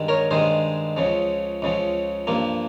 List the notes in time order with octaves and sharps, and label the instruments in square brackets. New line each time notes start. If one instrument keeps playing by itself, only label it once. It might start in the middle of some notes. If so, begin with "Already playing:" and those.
Already playing: [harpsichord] G2 D#3 G#3
A#4 C#5
G2 D#3 G#3 G#4 C5
C#2 C#3 F3
C#2 C#3 F3
G2 F3 A#3